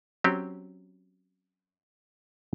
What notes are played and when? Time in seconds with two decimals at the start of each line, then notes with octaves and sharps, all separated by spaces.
0.24 F#3 C4 C#4 G4